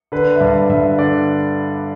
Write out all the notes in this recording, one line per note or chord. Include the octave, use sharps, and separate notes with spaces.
D3 B4
E5
G2 D5
G2 E5
D3 D5